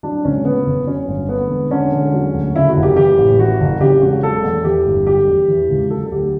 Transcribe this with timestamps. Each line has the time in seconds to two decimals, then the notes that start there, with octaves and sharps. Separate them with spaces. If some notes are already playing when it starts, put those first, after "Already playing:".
0.03 F#3 D4
0.25 C#2 C#4
0.45 C#3 B3
0.66 F#1
0.87 F#3 C#4
1.08 G1
1.29 D3 B3
1.50 E1
1.71 D3 C#4
1.92 E1
2.14 F#3
2.34 D2
2.55 C#3 E4
2.69 F#4
2.77 F#1
2.83 G4
2.96 E3 G4
3.18 A1
3.39 E3 F#4
3.60 F#1
3.81 C#3 G4
4.02 E1 F#4
4.23 F#3 A4
4.44 E2
4.64 E3 G4
4.86 G1
5.06 F#3 G4
5.27 E2
5.48 E3
5.69 C#2
5.90 F#3 A4
6.06 A4
6.11 D2 G4